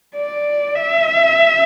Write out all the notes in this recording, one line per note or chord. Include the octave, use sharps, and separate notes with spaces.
D5
E5